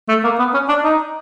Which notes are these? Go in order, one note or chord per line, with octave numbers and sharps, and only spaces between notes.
A3
A#3
B3
C#4
D4
D#4